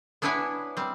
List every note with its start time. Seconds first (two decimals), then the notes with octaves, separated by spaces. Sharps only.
0.22 B3 D4 E4 B4 C#5 G#5
0.77 G3 C4